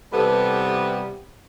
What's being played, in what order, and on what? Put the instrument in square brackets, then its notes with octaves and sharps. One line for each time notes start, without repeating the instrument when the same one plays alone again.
[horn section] C3 E3 G3 B3 A4